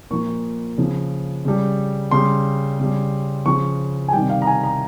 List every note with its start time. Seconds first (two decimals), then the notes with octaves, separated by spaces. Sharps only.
0.11 A#2 F3 C#6
0.78 C#3 F3
1.45 C#3 G3
2.11 C#3 G3 C6
2.79 C#3 G3
3.46 C#3 F3 C#6
4.08 G#5
4.13 C3 D#3 G3 G5
4.29 F5
4.42 A#5
4.47 G#5
4.63 A#5